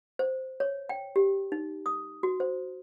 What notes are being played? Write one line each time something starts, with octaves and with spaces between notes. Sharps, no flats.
C5
C#5
G5
G4
D#4
D#6
F#4
C5